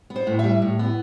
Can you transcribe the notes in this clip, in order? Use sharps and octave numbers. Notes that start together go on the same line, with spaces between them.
B3
C5
A2
G3 E5
A2
B3